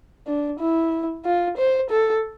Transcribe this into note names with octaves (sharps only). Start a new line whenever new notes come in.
D4
E4
F4
C5
A4